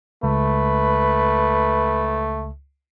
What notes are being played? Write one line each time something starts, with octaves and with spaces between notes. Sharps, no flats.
C#2 A3 B4